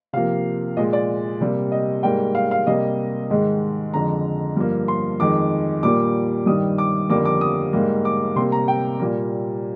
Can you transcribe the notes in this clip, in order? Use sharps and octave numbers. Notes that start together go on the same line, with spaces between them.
C3 F3 A#3 F5
A#2 G#3 D#5
D5
C3 G3 A#3
D#5
G#2 G3 A#3 G5
F5
F5
C3 G3 A#3 D#5
G#2 D#3 G#3
F2 D3 G#3 A#5
G2 F3 A#3
C6
F2 D#3 G#3 D6
A#2 G3 A#3 D6
G2 D#3 G3 D#6
D6
F2 D3 G3 A#3 D6
D6
D#6
G#2 G3 A#3
D6
C3 G3 A#3 C6
A#5
G5
A#2 G3 A#3